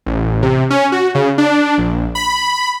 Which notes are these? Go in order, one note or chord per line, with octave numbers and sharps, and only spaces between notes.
A1
C3
C#4
F#4
C#3
D4
A#1
B5